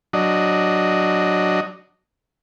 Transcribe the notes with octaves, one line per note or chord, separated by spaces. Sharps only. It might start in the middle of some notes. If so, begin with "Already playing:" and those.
F#3 D4 D#5